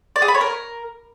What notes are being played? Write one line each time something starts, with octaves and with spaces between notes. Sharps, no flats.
D5
G#4
B5
C#5
A#4